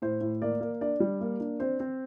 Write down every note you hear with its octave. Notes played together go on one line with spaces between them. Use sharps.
A2 C5
A2
A#3 D5
A#3
D4 D5
G3
A#3
D4
C4 C5
C4